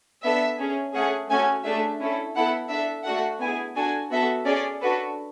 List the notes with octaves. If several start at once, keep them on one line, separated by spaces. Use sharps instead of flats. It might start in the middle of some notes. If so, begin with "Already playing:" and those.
B3 D4 A4 E5
C#4 G#4
A3 C#4 G#4 F#5
A3 C#4 F#4 A4 G#5
A3 D4 G#4 E5
C#4 E4 A4
B3 E4 A4 F#5
D4 A4 E5
A3 D4 F#4 A4 F#5
B3 E4 G#4 G#5
D4 F#4 A4 G#5
B3 F#4 A4 E5
C#4 G#4 D5
D4 F#4 A4 B4